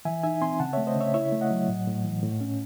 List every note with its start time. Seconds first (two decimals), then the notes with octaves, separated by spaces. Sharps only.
0.05 E3 E5 G#5
0.23 D#4 E5 G#5
0.42 C4 G#5 C6
0.60 C#3 F#5 A5
0.73 A3 C#5 E5
0.87 C5 D#5
0.96 C#3 C#5 E5
1.14 E4 C#5 E5
1.32 A3
1.41 D#5 F#5
1.51 F#3
1.68 A2
1.87 A2
2.05 E3
2.23 A2
2.41 C#4